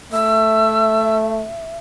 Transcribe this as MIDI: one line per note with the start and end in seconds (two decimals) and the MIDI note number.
0.12 1.46 57
0.12 1.77 76
0.12 1.15 88